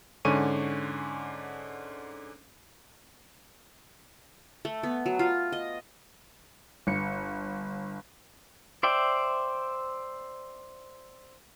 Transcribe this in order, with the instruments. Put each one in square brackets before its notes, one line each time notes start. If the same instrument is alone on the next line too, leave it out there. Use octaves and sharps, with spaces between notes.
[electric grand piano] G#2 D3 C#4 G#5 C#6 D#7
[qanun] A3
B3
F#3
F4
D#5
[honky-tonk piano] G1 C#7
[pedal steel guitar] C5 D5 E5 G5